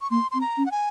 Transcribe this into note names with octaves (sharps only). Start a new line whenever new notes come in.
C#6
A#3 C6
C4 C6
A#5
C#4
F#5
G#5